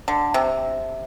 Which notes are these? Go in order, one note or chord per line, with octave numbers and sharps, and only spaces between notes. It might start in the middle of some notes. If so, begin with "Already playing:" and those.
D3
C3